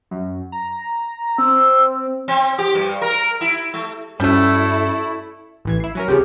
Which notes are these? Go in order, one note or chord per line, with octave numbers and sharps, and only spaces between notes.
F#2
A#5
C4 E6
C4
G4
G2
A#4
E4
A3
G2 G3 A3 C#4 E4 F#4 A4
A1 E3 G#6
E4 C7
F#3 C#4 A#4
C#2 C3 F3 G4 G#4 C#5